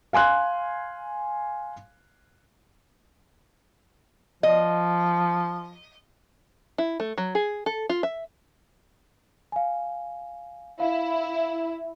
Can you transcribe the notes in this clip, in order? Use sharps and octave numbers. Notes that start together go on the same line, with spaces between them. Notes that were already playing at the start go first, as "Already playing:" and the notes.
F5 G#5 C6 F#6
F3 D#5
E4
A3
F#3
G#4
A4
F4
E5
F5 G#5
E4 F5